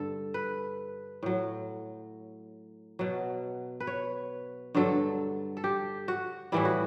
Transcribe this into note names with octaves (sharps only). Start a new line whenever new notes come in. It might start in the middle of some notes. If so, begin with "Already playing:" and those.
Already playing: G2 D3 A4
B4
A2 F#3
B2 F#3
B4
C#5
G2 D3 F#3 A4
A4
G4
F#4
A2 E3 G3 E4
F#4